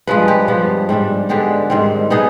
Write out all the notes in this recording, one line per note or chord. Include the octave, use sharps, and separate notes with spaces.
G2 F3 G#3 B4
G4
G2 F3 B3
G#2 G3 D4
D3 G#3 B3 D4 G4
G#2 D#3 G3 C4
D#3 B3 D#4 G#4